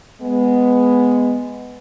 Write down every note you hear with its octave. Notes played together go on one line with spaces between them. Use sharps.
G#3 B3